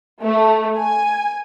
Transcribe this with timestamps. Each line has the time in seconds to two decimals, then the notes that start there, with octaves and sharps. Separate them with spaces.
0.22 A3
0.78 G#5